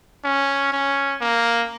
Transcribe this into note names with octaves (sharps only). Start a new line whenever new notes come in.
C#4
C#4
A#3